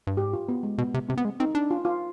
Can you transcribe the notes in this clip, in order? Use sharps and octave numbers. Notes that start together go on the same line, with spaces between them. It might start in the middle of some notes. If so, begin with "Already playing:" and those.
G2
G#2 G4
F4
B3
G#3
B2 B3
C3
C3 C4
B3
G#3
C4 D#4
D4
F4
F4